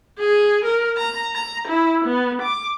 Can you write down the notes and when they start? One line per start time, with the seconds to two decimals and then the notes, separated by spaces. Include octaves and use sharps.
0.19 G#4
0.65 A#4
0.97 A#5
1.34 A#5
1.68 E4
2.05 B3
2.42 D6